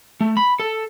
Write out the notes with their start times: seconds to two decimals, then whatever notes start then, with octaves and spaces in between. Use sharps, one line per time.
0.21 A3
0.37 B5
0.60 A4